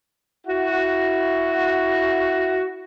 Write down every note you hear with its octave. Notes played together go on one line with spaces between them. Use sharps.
E4 F#4